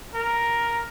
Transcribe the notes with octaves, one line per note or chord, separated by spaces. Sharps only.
A#4